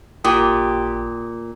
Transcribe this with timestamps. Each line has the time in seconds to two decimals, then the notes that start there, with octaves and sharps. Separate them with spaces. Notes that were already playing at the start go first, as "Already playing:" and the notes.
0.25 A1 A#2 G4 D#6